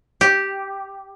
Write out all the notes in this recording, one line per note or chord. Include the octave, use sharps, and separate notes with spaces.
G4